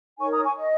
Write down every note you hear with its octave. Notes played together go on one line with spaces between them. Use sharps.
D#4 A#4 C#5 G#5 C#6
A#5 D#6
G#5 C#6
D#5